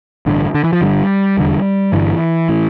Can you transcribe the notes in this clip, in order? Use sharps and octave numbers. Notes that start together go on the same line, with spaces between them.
A1 G2 D3
D3
E3
F3
G1 G2 D3 G3
F1 E2 D3
G1 G2 D3 E3
A2